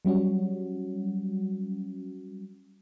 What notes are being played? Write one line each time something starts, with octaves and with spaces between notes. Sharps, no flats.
F#3 G3 C#4 F#4